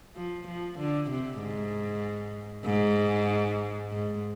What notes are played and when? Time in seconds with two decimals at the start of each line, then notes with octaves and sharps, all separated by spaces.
0.16 F3
0.47 F3
0.79 D3
1.10 C3
1.40 G#2
2.65 G#2
3.91 G#2